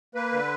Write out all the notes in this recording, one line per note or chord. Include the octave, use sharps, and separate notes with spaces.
A#3 B4
D3